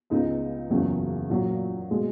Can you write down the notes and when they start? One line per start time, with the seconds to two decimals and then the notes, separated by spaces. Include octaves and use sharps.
0.10 C#2 C#3 G#3 B3 D#4
0.70 F#1 E2 C#3 F#3
1.29 A#1 A#2 F#3
1.90 B2 G#3